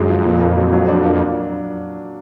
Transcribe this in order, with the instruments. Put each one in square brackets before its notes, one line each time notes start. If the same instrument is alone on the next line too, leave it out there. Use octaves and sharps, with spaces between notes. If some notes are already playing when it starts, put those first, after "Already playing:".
Already playing: [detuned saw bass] F#2 [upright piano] D3 F#3 G#3
[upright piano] F3
[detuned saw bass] F2 [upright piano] A#2
[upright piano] A#3
F#3
F#3
D4
A#3